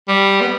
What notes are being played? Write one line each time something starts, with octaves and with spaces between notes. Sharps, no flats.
G3
B3